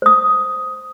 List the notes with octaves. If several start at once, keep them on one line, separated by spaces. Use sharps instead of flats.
C5 D#6